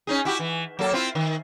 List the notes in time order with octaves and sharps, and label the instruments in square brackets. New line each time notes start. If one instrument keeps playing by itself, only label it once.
[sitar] C#4 D#4 G#4
E4 F#4 G4
E3
F#3 A#3 A4
C4 E4 F4
D#3